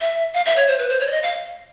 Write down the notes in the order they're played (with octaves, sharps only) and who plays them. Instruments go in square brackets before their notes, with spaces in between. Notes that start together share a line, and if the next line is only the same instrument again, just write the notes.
[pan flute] E5
F5
E5
C#5
C5
B4
C5
C#5
D5
D#5
F5